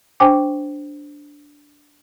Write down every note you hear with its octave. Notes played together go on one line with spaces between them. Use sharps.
D4 C5 G5 G#5 D6